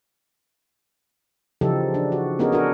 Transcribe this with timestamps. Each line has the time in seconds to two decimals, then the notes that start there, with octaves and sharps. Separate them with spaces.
1.61 C#3 E3 F3 D#4 G4 A4
1.94 D4
2.12 F#4
2.39 B3 C#4 D#4 F#4 G#4 A#4
2.52 D4 F#4 A4 A#4